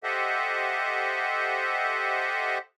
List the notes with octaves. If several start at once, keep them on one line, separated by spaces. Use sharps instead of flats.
G4 A4 C5 D#5 E5 F#5